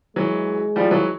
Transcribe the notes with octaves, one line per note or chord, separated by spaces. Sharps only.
E3 F#3 G#3
F3 G3
E3 F#3